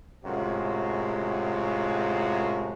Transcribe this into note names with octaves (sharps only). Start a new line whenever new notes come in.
F#2 A2 C3 G#3 F4 F#4